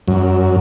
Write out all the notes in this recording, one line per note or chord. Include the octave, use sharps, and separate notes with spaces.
F#2